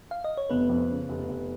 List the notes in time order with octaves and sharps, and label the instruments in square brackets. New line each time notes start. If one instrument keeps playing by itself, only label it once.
[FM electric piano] F5
D#5
C#5
[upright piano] F1 [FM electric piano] B3 B4
[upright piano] F2
C#3
F1
F1